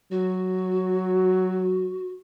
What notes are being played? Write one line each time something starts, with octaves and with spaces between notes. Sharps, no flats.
F#3 F#4